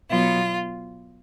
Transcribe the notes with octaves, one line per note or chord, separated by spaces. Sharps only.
B2 F#3 B3 F4